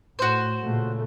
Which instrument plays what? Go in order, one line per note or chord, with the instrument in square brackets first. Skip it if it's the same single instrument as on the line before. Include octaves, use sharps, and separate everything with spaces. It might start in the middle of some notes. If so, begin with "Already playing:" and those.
[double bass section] A2 [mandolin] F#4 C5
[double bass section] A#2 C#3 A3